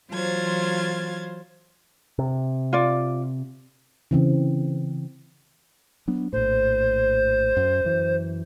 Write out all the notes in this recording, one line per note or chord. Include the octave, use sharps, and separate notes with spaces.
E3 F#3 F4 C5 G#6 A6
C3
F4 D5
C#3 E3 C4
F#3 B3 D4
A#1 A2 C5
F#2
F#2 E3